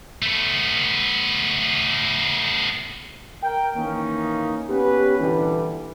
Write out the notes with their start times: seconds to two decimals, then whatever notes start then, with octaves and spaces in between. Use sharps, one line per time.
0.22 A3 B3
3.43 A#4 G5
3.76 D#3 E3 A#3 C#4 D#4
4.69 B3 C#4 G4 B4
5.19 A#2 D3 E3 G3